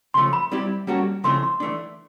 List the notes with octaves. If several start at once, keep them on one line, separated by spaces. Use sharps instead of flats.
C#3 F3 A3 C6
B5
G3 C4 E4 G4
G3 A#3 C#4 F#4 A4
C#3 F3 A3 C4 E4 C6
C6
E3 A3 D4